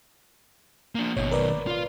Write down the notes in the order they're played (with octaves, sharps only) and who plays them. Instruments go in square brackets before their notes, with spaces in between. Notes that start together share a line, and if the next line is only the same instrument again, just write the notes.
[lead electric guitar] A#3 D4
[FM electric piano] G#1 C#5 [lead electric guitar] B2 D#3
[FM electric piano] A#4 B4 D5
[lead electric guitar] F4 F5